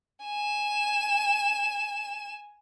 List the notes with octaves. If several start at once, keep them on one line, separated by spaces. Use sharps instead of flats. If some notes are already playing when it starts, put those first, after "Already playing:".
G#5 E7